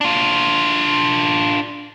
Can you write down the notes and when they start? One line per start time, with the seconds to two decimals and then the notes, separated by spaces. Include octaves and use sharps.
0.01 D4 F4